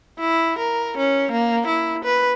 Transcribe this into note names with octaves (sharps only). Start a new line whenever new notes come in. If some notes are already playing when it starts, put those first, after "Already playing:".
E4
A#4
C#4
A#3
E4
B4